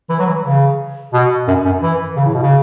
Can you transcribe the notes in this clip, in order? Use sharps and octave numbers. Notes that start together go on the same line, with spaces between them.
E3
F#3
E3
C#3
B2
F#2
F#2
E3
C#3
A2
B2
C#3